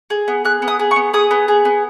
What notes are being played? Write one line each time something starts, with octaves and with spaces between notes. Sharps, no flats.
G#4
B3
G#4 F#6
B3
D#6
G#4
C#6
B3
G#4 D#6
B3
G#4
B3